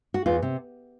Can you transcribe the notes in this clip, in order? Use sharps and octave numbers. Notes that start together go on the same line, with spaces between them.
F#4
E2 F4
C3